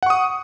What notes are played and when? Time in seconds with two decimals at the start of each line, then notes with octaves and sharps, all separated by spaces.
0.03 F#5
0.06 C#6
0.10 D#6